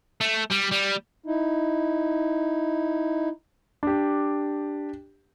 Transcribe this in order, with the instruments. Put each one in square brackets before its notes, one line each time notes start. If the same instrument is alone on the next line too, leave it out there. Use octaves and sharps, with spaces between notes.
[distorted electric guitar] A3
G3
G3
[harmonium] D#4 E4
[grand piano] D4 G4